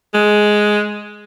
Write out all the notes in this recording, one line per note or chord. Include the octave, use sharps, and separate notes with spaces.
G#3